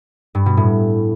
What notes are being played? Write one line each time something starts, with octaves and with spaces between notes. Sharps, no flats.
G2
B2
A2